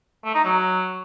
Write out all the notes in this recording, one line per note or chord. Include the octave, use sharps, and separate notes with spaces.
A3
D#4
F#3